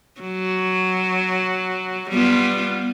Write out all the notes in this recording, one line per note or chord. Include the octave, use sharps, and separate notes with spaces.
F#3
G3 B3 F4